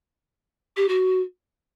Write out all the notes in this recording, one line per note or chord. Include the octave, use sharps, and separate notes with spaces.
G4
F#4